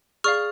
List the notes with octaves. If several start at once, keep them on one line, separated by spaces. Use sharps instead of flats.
G#4 D5 F5 C#6 F6